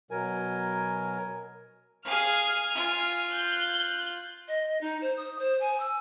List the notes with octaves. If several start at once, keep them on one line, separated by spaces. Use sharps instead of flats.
B2 F#3 A#4 G#5
G#4 F5 G#5 F6
F4
F#6 G6
D#5
D#4
C5
D#6
C5
G#5
E6